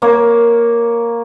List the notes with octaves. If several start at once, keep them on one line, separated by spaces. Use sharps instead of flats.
A#3 C#5